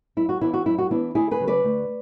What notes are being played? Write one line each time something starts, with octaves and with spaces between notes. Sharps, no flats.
F#2 E4
F#4
E3 B3 D4 E4
F#4
F#2 E4
F#4
E3 B3 D4 E4
D2 E4 G#4
G#4 B4
C#3 F#3
B4 D5
D2